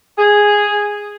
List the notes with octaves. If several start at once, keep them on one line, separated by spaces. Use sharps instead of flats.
G#4